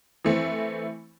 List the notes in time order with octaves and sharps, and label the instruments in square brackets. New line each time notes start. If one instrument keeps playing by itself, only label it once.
[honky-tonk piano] E3 A3 C4